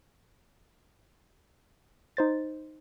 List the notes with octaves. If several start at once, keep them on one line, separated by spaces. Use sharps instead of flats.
D#4 C5 A6